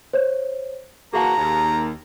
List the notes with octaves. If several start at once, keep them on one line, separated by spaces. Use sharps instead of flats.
C5 C#5
E3 A#3 F#4 G#4 F5 A5 A#5
D#2